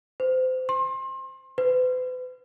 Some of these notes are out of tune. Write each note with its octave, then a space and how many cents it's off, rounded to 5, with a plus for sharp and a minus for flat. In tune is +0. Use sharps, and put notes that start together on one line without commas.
C5 -30
C6 +30
B4 +40